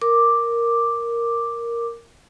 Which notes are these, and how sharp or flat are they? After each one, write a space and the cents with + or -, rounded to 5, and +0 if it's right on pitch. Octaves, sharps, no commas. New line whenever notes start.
A#4 +0 D6 +0